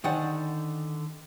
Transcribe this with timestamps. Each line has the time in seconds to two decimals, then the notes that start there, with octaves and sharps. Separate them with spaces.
0.04 D3 D#3 C5 D5 F#5 G#5